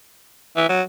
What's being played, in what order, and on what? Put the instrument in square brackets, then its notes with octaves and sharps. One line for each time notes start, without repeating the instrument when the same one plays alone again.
[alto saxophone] E3
F#3